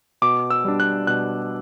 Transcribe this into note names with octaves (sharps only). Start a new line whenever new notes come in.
B2 D6
E6
G3 D4
F#6
B2 F#6